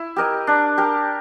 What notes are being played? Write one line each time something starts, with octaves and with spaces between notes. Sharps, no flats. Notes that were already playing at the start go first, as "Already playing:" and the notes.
Already playing: E4
G4 A#4 D#5
D4
G4 A#4